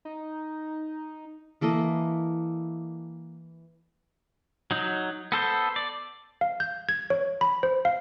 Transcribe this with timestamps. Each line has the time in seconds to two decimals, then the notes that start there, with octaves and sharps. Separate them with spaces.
0.05 D#4
1.61 E3 A#3 A4 D#5
4.71 F#3 D#4
5.32 B3 A4 C5
5.76 D5
6.41 F5
6.60 G6
6.89 G#6
7.10 C#5
7.41 B5
7.63 C5
7.85 F5